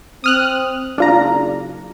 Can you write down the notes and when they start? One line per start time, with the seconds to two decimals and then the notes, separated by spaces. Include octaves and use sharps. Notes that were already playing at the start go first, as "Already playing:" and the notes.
0.24 C4 D#6 F6 F#6
0.98 F#1 D4 F4 A#5